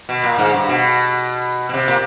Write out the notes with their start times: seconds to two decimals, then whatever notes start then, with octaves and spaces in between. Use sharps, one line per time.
0.09 B2
0.24 A#2
0.38 G#2
0.53 G2
0.69 B2
1.69 B2
1.74 C3
1.88 A#2